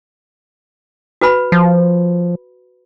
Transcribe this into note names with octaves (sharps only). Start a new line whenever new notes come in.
F#4 B4 B5
F3